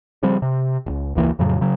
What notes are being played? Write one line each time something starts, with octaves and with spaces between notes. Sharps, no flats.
C#3 F3 G3 C4
C3
E1 C#2
E1 C#2 E3 A#3
F2 A2 C#3 F#3
C#3 F#3